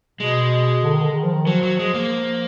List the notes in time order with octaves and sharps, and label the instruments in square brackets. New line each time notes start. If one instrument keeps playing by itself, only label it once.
[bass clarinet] B2 [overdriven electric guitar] G#3
[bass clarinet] D3
D#3
D3
D#3
F3
D#3
[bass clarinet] F3 [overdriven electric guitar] F#3
[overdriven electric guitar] F#3
G#3
A#3